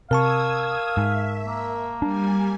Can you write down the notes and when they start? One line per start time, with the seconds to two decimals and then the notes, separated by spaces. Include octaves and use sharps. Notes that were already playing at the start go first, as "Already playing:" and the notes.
0.11 C3 A#4 F5 A5 C#6 D#6 E6 G#6
0.97 G#2 E5
1.46 A#3
2.02 G3 D4 G#5